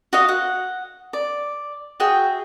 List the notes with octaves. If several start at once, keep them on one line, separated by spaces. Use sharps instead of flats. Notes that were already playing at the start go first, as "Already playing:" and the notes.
F#4 D#5 F5
F#5
D5
F#4 G#4 E5 G5